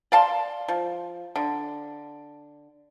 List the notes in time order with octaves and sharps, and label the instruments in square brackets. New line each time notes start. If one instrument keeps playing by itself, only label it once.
[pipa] D5 F5 A5 C6
F3
D3